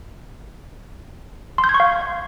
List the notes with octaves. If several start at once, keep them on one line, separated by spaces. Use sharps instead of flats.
C6
G6
G#6
C#6
F5